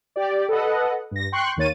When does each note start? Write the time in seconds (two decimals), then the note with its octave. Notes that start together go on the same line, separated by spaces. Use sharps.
0.16 G4 D5
0.49 A4 B4 D#5 F#5
1.11 G2 A#6
1.32 G5 C6 C#6 F#6
1.56 D#2 D#3 A#3 C#5 A6 D#7